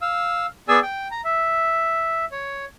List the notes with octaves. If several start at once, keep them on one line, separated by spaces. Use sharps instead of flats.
F5 E6
B3 G#4 D5 G#5 E6
G5
A#5
E5
C#5